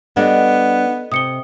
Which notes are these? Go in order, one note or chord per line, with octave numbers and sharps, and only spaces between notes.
G3 B3 D4 A4 D#5 F#5
C3 D#6 C#7 G7